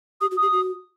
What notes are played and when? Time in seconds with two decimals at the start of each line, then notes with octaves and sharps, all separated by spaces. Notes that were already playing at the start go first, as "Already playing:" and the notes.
0.21 G4 D#6
0.31 F#4
0.37 G4 D#6
0.52 F#4